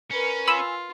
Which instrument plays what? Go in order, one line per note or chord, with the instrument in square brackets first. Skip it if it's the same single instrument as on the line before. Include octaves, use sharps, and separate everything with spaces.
[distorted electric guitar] C#4 [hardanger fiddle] A#4 B4
[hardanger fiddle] F4 [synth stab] G#5 B5 E6